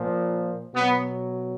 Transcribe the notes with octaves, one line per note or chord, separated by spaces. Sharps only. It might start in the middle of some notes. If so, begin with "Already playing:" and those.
Already playing: A#2 F3
B2 F#3 B3